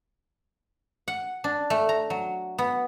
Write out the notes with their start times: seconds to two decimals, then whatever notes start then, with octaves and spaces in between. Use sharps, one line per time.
1.08 F#5
1.44 D4
1.70 A3
1.89 A#5
2.10 F#3
2.58 B3